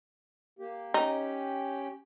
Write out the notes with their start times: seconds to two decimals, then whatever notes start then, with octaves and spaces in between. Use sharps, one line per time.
0.59 A#3 G4
0.94 C#4 D#4 G4 G5